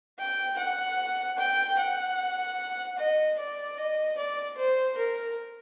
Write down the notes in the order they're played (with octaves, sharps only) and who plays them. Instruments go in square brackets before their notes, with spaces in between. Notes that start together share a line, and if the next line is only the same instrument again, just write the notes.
[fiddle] G5
F#5
G5
F#5
D#5
D5
D#5
D5
C5
A#4